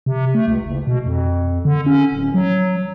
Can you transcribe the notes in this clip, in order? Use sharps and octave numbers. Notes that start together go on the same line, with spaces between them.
C3
A3
C#2
F#1
B2
F2
D3
C#4
D1
F#3